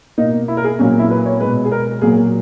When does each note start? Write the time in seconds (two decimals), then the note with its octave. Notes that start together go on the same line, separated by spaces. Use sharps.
0.18 B2 A#3 D#4
0.48 E4
0.57 A#4
0.64 G#4
0.79 A#2 F#3 A#3 C#4
0.99 E4
1.10 B4
1.26 C#5
1.40 G#3 B4
1.45 B2
1.65 G#4
1.72 A#4
2.01 A#2 F#3 A#3 G#4